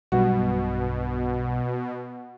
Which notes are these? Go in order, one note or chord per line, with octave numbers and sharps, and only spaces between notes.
B1 G2 B2 F#4